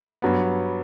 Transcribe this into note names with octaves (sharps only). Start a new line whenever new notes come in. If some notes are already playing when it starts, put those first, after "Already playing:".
G2 F#3 B3